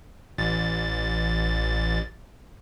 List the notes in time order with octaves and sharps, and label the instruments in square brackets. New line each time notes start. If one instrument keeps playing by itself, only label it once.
[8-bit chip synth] A1 A6